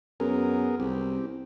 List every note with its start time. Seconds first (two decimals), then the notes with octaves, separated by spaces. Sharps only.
0.20 F#2 B3 G#4 A#4
0.80 C2 C4 G4